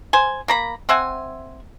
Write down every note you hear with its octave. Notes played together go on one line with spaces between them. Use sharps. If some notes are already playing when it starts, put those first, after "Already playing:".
C5 G#5
A#3 A#5 B5
C4 E5 F#5 G#5